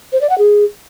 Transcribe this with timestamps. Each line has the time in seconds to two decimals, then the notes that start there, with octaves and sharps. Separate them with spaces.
0.13 C5
0.21 D5
0.30 F#5
0.38 G#4